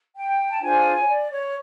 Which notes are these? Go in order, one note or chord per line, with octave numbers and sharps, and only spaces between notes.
G5
A5
D4 F4 G#4 C5 G#5
C#5
D5
C#5